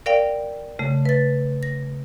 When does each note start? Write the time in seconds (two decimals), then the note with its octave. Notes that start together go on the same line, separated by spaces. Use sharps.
0.06 A#4 D5 F5 G5
0.79 C#3 A3
1.05 B4 A6
1.63 A#6